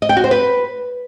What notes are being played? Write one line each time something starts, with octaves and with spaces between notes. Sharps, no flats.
D#5
G5
F#4
C5
B4